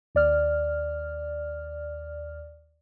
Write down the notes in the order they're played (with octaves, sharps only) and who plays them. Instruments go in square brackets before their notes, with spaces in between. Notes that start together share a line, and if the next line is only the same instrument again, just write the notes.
[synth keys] D#2 D5 F6